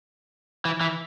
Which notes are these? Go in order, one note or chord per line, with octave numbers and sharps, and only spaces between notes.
E3
E3